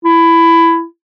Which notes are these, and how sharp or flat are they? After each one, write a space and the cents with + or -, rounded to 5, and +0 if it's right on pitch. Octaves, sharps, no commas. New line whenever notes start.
E4 +15